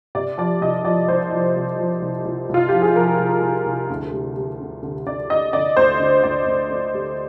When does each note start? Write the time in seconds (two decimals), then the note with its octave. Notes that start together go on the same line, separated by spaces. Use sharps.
0.15 C3 D5
0.38 F3 D5
0.61 C2 D#5
0.85 F3 D5
1.08 C2 C5
1.32 F3
1.56 C2
1.78 F3
2.01 C2
2.25 C2
2.49 C2
2.54 F4
2.68 F3 G4
2.82 G#4
2.96 F3 A#4
3.19 C2
3.42 C2
3.66 C2
3.90 D2
4.13 G3
4.36 G3
4.60 D3
4.83 D3
5.06 D3 D5
5.30 D3 D#5
5.53 D3 D5
5.77 D2 C5
6.00 D2
6.23 D2 D5
6.46 D2
6.70 D3
6.94 G3